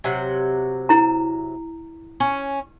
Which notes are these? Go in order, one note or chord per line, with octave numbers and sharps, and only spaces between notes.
C3 F#3
E4 A#5
C#4